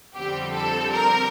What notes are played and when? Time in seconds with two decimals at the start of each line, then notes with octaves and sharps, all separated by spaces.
0.14 F2 D3 G3 C4 G4
0.53 A4
0.91 A#4